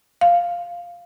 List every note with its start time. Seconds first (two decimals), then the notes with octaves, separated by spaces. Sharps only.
0.21 F5